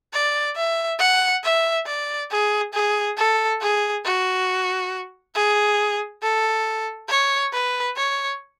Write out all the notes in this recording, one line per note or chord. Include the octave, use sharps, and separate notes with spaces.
D5
E5
F#5
E5
D5
G#4
G#4
A4
G#4
F#4
G#4
A4
C#5
B4
C#5